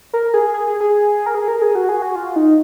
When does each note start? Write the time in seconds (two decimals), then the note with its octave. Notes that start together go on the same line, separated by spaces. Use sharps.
0.13 A#4
0.34 G#4
0.54 G#4
0.67 G#4
0.81 G#4
1.26 A#4
1.35 G#4
1.48 A#4
1.62 G#4
1.75 F#4
1.89 G#4
2.02 F#4
2.16 F4
2.36 D#4